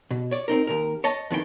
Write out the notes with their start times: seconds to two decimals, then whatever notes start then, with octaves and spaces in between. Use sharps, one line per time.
0.11 B2
0.31 C#5 D5
0.48 C4 D#4 A#4
0.67 D#2 A#2 A#4
1.04 C#5 D#5 A5
1.30 F2 D#3 E3 G5